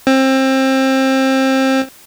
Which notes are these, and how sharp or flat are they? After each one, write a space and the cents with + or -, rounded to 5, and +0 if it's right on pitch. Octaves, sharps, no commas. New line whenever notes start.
C4 +25